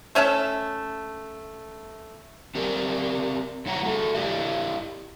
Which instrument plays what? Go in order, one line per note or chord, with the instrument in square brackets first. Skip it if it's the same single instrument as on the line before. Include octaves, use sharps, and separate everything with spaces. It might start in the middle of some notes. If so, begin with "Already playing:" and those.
[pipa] A3 C#4 E5 A5
[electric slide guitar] C4 G4 A#4 D5
F#2 E4 C#5 F#5 A#5
G#3 F#4 A4
E4 G4 D5 D#5